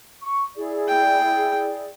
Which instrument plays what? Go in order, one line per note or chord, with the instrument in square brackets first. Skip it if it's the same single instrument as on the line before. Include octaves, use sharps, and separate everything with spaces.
[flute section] C#6
E4 G#4 D5
[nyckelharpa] G5